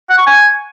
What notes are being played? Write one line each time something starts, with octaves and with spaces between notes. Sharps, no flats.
F#5
C#6
G#5